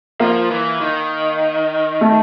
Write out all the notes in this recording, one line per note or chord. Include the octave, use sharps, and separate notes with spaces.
F3 A#3
E3
D#3
A3